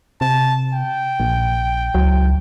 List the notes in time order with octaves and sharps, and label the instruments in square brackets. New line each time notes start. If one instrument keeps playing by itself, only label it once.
[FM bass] C3 [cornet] A5
[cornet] G5
[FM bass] A#1
[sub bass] C#2 [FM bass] F#3